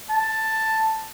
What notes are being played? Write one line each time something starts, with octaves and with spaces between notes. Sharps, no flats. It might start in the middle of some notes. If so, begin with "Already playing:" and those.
A5